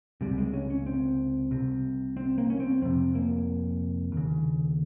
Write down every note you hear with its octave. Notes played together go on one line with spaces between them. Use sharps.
C#2 C3 G3
G#3
C#4
C#4
C4
C2 C3
C4
A#3
C#4
C4
F2 C3 C4
A#3
D#2 C#3